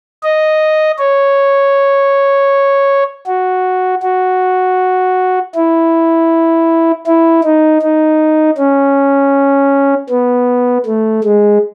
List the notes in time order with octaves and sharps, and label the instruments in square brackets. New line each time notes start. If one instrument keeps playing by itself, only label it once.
[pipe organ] D#5
C#5
F#4
F#4
E4
E4
D#4
D#4
C#4
B3
A3
G#3